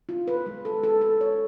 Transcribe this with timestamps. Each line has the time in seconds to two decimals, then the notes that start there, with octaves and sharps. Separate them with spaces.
0.09 F4
0.28 B4
0.46 G#3
0.65 A4
0.83 A4
1.01 A4
1.21 C#5